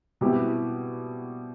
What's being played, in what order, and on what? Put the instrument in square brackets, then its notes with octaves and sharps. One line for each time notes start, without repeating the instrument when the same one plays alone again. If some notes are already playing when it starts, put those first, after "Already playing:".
[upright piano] B2 G3 C4 E4 G4